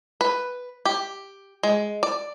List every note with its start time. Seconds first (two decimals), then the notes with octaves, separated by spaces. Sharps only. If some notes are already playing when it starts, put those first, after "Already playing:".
0.21 B4
0.85 G4
1.63 G#3
2.03 D5